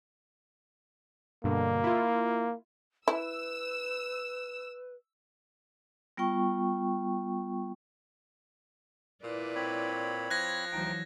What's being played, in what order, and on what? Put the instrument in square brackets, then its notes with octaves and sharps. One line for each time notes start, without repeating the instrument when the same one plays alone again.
[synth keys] G2 B2 D3 [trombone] A#3
[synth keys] E4 F4
[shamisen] E4 [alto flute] B4 [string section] E6
[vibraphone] G3 B3 F4 G5 C#6
[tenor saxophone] A#2 [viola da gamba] E4 B4 D5
[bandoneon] C4 C#5 B5
[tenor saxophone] F3 [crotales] F#6 G#6 A#6
[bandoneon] D2 D#4 G5 [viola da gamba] E3 F#3